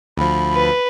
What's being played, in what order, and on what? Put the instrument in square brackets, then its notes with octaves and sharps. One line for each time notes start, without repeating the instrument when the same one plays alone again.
[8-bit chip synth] D2 F3 [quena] B5
[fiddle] B4